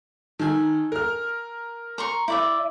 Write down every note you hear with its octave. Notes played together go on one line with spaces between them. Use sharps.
D#3 A4 G#5
A#4 F6
A#5 C6 C#6
E4 D5 E5